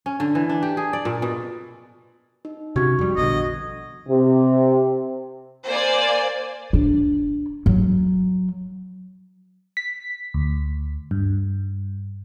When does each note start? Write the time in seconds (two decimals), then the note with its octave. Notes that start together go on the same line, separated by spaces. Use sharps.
0.06 C#4
0.20 D3
0.35 E3
0.49 D4
0.63 G4
0.77 G#4
0.93 D5
1.05 A#2
1.22 B2
2.45 D#4
2.76 C3 C#4 F#4 C#6 G#6
2.99 F2 G3
3.17 A#1 B2 D3 D#5
4.09 C3
5.66 A#3 C5 D5 G#5
6.73 D4
7.66 F#3
9.77 B6
10.34 D2
11.11 G2